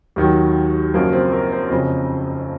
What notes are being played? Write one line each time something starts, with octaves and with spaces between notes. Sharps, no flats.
D#2 D#3 F#3
F#1 F#2 F3 A#3
C4
A#4
C5
F#1 F2 C#3 F3 D#5